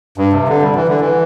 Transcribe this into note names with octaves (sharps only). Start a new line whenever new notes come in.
G2
C3
D3
G3
E3
D3
E3